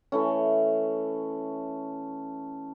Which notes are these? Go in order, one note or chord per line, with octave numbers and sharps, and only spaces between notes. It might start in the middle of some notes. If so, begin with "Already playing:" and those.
E3 A3 C#4